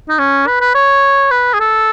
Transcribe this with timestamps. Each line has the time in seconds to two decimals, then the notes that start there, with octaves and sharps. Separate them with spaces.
0.09 D#4
0.19 C#4
0.47 B4
0.61 B4
0.75 C#5
1.31 B4
1.54 G#4
1.60 A4